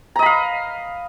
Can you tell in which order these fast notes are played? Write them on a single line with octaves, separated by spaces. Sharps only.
A#5 D#5 B5 F5